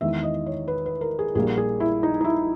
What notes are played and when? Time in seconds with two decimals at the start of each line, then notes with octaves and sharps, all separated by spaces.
0.01 E2 D#3 G#3 E5
0.23 D#5
0.46 C#5
0.68 B4
0.86 B4
1.01 A#4
1.19 G#4
1.35 A#1 A#2 G3 A#3 G#4
1.58 G#4
1.80 E4
2.03 D#4
2.21 D#4
2.24 E4